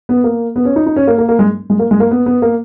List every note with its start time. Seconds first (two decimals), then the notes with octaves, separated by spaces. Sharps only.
0.09 B3
0.24 A#3
0.56 B3
0.65 C#4
0.76 D#4
0.86 D#4
0.96 C#4
1.07 A#3
1.18 A#3
1.29 A#3
1.39 G#3
1.70 G#3
1.79 A#3
1.91 G#3
2.00 A#3
2.11 B3
2.26 B3
2.42 A#3